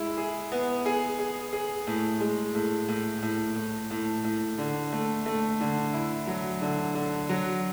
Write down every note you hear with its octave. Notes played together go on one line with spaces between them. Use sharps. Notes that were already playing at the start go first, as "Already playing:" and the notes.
Already playing: G#3 E4
G#4
B3
G#4
G#4
G#4
A2
G#3
A2
A2
A2
A2
A2
A2
D3
A3
A3
D3
E4
F#3
D3
D3
F#3